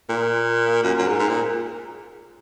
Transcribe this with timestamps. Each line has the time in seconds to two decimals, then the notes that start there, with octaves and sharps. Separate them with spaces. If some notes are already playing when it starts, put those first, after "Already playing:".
0.09 A#2
0.83 F#2
0.99 F#2
1.08 G#2
1.19 G#2
1.29 A#2